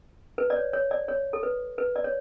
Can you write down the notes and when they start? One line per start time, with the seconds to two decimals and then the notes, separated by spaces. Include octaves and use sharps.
0.38 B4
0.50 D5
0.56 C#5
0.73 C#5
0.91 D5
1.08 C#5
1.33 A4
1.43 B4
1.78 B4
1.96 D5
2.04 C#5